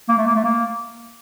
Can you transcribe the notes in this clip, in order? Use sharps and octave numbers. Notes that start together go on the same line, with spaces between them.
A#3
A3
A#3
A3
A#3